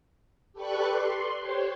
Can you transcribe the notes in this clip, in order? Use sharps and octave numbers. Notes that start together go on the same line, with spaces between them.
G4 A4 B4 D5 C#6 F#6
C6
G4 C5 C#5